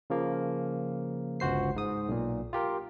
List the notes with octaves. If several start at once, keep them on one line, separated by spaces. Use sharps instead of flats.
C#3 F3 A#3
G1 C#2 F#4 C5 C7
G#2 D#6
B1 A#2
F4 G4 A#4